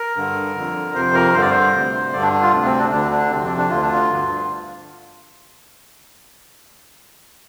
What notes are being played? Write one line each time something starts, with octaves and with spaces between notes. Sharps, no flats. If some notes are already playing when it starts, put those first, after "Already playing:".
Already playing: A#4
G2 D3
F2 D3
F2 C3 C5
A#4
G2 D3 C5
D5
C5
D2 C3
G2 D3 D5
D4
D4
F4
D2 C3 D4
C4
D4
D2 D3 D4
D4
F2 C3 C4
D4
D4
D2 D3 F4
D4
F4
G2 D3